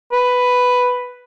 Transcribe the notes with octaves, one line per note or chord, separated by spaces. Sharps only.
B4